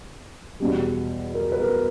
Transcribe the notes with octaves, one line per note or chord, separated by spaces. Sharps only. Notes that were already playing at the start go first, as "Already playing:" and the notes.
E2 B2 G3
A#4
B4
A#4